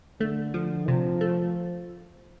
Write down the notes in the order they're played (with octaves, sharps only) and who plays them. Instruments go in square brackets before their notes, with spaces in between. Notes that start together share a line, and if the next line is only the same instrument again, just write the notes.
[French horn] D3 [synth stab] A3
[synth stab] F3
[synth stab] C3 [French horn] F3
[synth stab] A3